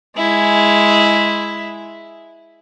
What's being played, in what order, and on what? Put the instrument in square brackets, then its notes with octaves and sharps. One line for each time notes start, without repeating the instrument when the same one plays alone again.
[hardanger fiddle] G#3 E4